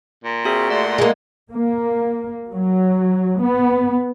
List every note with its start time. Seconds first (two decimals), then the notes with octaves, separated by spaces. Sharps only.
0.24 A#2
0.45 C4 F#4 G#4 A#4 E5
0.70 A3 D5 F#5 C6
0.98 G#3 A#3
1.52 A#3
2.51 F#3
3.41 B3